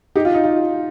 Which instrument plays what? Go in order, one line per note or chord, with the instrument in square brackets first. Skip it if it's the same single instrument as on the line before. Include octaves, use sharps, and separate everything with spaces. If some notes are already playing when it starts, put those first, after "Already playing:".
[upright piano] D#4 G4
F4
D#4
F4